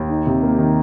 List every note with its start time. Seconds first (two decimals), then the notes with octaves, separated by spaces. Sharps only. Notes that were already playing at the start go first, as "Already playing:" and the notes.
Already playing: D#2
0.09 D#4
0.27 C3
0.42 A#3
0.58 D#3